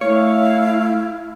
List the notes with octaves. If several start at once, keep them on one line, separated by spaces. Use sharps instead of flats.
A3 E4 C#5 F5